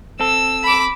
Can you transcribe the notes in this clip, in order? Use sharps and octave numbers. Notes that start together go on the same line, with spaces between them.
C4 A4 E6
B5 D6